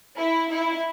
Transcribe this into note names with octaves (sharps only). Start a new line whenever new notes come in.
E4
E4